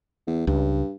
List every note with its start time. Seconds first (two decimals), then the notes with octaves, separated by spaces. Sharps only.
0.27 E2
0.47 C#2 G2